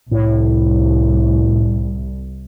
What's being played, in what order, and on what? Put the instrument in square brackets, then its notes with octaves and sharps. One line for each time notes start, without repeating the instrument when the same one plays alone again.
[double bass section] C2 [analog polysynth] A2